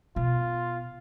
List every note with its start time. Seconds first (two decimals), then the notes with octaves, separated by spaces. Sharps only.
0.16 B2 F4